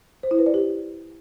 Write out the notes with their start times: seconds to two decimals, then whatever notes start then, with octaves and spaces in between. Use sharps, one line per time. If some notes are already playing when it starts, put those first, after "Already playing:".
0.23 C5
0.31 E4
0.39 B4
0.46 D5
0.54 G4